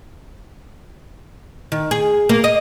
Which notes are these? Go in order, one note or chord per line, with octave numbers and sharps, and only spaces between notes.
D#3
G#4
A#3
D#5